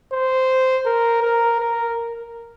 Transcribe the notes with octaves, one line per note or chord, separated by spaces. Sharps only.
C5
A#4
A#4
A#4